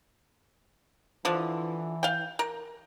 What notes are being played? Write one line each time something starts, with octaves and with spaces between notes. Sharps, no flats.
D3 E3 F3
F5 G5
A#4